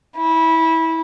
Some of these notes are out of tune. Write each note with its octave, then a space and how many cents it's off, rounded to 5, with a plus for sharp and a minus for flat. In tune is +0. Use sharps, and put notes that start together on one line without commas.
E4 -20